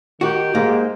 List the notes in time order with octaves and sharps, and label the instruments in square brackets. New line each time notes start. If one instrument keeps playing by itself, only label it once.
[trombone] D#3 [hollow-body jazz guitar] F#4 [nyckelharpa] G4
[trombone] G#2 [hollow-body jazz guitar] A#3